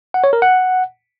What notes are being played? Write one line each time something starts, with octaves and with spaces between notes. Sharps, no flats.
F#5
C#5
A#4
F#5